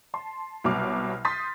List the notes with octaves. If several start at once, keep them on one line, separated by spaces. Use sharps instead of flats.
A5 C6
C2 B2 F#3 D6 F6
C6 D#6 G6 A6 B6